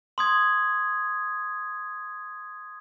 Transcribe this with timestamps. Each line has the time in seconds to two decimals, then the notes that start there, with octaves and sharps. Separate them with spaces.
0.18 C6 D#6 G#6